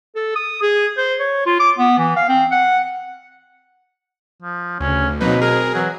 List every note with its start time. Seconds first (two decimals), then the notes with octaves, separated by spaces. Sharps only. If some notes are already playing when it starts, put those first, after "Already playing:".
0.15 A4
0.35 D#6
0.62 G#4
0.97 C5
1.20 C#5
1.46 F4
1.60 D6
1.78 B3
1.98 E3
2.16 F5
2.29 C4
2.51 F#5
4.42 F3
4.80 D2 C#3 C#4
5.20 B2 F#3 A#3 C4 D#4 B4
5.41 G#4 A#4
5.75 E3 F#3